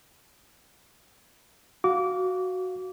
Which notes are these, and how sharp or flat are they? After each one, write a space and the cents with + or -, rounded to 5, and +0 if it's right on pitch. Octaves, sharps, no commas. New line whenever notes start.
F#4 +0 F5 +0 D6 -25